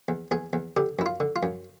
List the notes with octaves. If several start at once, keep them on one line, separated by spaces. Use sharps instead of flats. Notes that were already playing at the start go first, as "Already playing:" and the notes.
E2
E2 G#4
E2
D3 G4
F#2 E4
F4
D3
F4
F#2